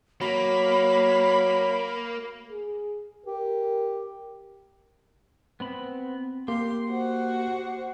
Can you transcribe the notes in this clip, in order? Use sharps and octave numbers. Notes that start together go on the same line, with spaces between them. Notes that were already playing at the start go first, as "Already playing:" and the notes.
F#3 A#3 B5
G#4
G4 A#4
B3 C4 B5
A#3 G4 C6
F#4 C5 F#5